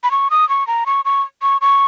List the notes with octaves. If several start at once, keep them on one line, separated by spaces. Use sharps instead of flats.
B5
C#6
D#6
C#6
A#5
C#6
C#6
C#6
C#6